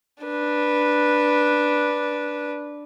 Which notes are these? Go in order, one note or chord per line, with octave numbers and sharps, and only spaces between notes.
D4 B4